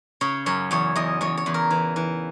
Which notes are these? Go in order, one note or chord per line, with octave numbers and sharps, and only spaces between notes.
C#3 C#5
F#2 C#5
E2 C#5
E2 D#5
E2 C#5
C#5
E2
A#4
E3
E3